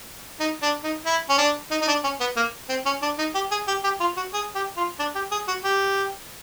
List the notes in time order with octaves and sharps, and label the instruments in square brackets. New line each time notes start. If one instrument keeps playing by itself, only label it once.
[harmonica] D#4
D4
D#4
E4
C#4
D4
D#4
D#4
D4
C#4
B3
A#3
C4
C#4
D4
D#4
G4
G#4
G4
G4
F4
F#4
G#4
G4
F4
D4
G4
G#4
F#4
G4